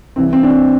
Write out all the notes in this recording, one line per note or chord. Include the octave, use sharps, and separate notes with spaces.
C2 C3 E3 C4
C4
D4
C4